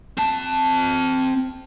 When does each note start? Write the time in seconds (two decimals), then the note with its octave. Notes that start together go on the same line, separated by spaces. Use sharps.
0.18 C4 A5